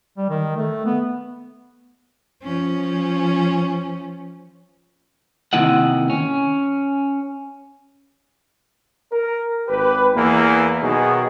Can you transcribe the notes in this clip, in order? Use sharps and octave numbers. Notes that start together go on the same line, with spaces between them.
G3
D#3
A3
B3
F3 C#4
C3 D#3 A#3 E4 D#5 F#5
C#4
A#4
G#1 G4 B4
E2 E3 A#3
B2 D#3 F#3 D#4 G#4